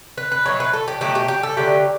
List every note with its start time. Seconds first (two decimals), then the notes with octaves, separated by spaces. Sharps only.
0.18 B4
0.32 B4
0.45 B2 F#3 A3 C#5
0.60 B4
0.73 A4
0.88 G4
1.01 B2 F#3 A3 G4
1.15 G4
1.28 G4
1.43 A4
1.57 D3 F#3 A3 G4